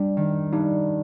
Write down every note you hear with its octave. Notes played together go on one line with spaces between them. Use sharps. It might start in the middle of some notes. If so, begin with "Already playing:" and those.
Already playing: G3 D4
D#3
G2 D#4